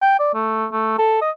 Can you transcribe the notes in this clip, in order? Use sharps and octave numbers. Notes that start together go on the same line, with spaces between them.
G5
D5
A3
A3
A4
D#5